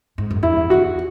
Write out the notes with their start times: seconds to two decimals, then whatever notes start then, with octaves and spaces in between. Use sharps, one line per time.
0.18 G#2
0.31 F#2
0.43 E2 E4
0.70 E2 F#4